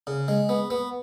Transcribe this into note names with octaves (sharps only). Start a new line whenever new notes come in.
C#3
G#3
B3
B3